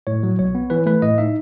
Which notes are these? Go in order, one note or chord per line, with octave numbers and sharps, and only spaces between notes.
A2 C#5
F#3
B1 C#5
B3
E3 B4
A3 B4
A2 D#5
D#4 E5